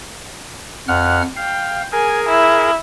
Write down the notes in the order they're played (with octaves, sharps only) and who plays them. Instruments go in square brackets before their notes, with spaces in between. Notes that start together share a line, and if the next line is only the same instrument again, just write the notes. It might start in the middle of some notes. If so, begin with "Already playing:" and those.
[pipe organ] F2 F#5 F6
[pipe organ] F5 [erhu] G5
[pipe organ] G#4 A#4 [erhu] G#5
[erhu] E4